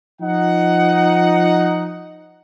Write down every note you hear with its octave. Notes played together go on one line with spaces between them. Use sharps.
F3 D#4 F#5